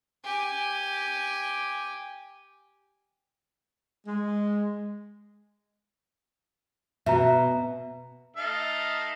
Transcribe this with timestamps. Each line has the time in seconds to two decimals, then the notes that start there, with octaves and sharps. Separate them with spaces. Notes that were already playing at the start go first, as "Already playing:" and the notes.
0.25 G4 G#5
4.07 G#3
7.06 B2 E5 A#5
8.37 A3 D#4 F5